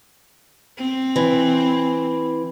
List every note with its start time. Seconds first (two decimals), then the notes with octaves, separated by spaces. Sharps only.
0.78 C4
1.16 E3